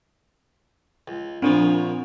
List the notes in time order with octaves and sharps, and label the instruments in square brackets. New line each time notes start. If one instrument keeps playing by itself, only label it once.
[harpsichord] C#2
[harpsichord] A#2 C#3 F3 [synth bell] C4 D4